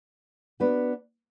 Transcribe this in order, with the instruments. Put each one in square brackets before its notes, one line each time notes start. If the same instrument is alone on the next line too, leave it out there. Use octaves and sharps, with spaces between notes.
[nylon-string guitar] B3 D4 F#4 B4